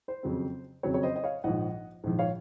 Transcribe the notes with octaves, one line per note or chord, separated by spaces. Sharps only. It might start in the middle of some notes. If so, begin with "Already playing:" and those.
C5
F2 C#3 F#3 C4
F2 C#3 F#3 C4 C#5
C#5
C5 D#5
D#5
C#5 F5
A#1 G#2 F3 D#5 F#5
A#1 G#2 F3
C#5 F5